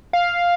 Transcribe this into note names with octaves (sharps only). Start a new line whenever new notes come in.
F5